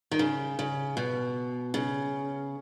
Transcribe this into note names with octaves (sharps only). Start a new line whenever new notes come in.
D#3
C#3
C#3
B2
C#3